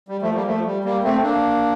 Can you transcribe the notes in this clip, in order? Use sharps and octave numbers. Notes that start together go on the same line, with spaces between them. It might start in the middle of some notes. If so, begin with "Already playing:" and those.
G3
F3 A3
G3 A#3
F3 A3
G3
G3 A#3
A3 C4
A#3 D4